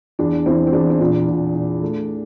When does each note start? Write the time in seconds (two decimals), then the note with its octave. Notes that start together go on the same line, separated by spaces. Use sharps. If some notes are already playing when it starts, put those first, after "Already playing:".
0.19 E2 D4
0.46 E2 C4 E4
0.67 C4
0.73 E2 D4
0.90 C4
1.00 A#2 D4
1.28 A#2
1.55 A#2
1.81 A3